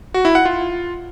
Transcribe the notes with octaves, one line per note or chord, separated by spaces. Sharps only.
F#4
E4
F#5
F4